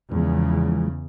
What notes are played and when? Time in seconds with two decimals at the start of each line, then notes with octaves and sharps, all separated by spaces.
0.12 E2 C#3 E3 F3 G#3